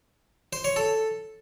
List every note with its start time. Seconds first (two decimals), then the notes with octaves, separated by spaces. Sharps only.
0.53 C5
0.64 C#5
0.76 A4